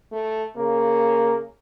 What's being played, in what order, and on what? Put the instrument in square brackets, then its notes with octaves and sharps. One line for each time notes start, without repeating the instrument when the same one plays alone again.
[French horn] A3
[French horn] C#3 [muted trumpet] A#3